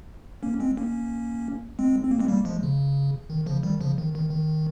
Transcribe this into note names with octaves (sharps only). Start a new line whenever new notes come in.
A#3 C#4
G#3 C4
A#3 C#4
G#3 C4
C4
A#3
G#3 C4
G3 A#3
F3 G#3
C#3
D#3
C#3 F3
D#3 G3
C#3 F3
D#3
D#3
D#3